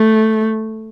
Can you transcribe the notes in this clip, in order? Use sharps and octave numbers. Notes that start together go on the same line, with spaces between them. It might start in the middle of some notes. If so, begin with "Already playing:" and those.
Already playing: A3